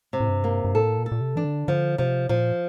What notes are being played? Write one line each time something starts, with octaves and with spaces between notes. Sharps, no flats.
C3
A2
G2
A#3
G2
A2 A4
A#2
A4
A#2
C3
E3 D4
D3
D3 F3
C3 F3
A#2 F3